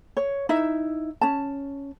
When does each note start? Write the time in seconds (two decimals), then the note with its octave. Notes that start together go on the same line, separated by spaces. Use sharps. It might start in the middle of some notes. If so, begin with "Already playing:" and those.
0.17 C#5
0.49 D#4 E4 E5
1.21 C#4 A5